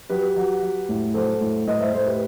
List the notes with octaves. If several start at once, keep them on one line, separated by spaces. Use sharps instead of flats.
F#3 G4 B4
F#3
F#3
A2
F#3 A4 C5
A2
A2 B4 D#5
C5 E5
A2 A4 C5
G4 B4